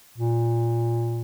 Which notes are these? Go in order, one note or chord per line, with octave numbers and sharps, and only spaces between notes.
A#2